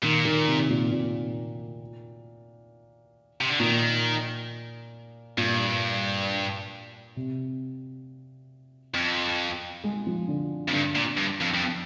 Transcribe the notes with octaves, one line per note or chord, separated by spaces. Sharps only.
A#2 D#3
D#3
C3
A#2
A#2
C3
D3
A#2 D#3
G2 A#2
C3
F2
G#3
F3
D3
F2
G2 D3
A#2
G2
F2
F2